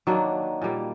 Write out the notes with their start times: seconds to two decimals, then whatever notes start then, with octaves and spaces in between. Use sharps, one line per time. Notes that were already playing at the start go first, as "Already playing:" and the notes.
0.07 D#3 F#3 A#3 D4
0.62 A#2 G3 A#3